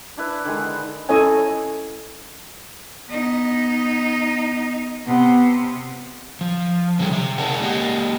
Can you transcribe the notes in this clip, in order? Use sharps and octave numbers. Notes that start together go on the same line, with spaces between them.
D4 E4 B4
D3 D#3 G#3
C#4 E4 A4 C#5 D#5 G#5
B3 D#4
C3 B3
F3
D3 F#3 G3 A3 G#4
C3 E5
G#4 A#4 C#5 D5 F#5 A5
G#3 A#3 G4 D#5 F#5